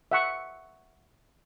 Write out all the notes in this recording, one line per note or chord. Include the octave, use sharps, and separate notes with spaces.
E5 F#5 C#6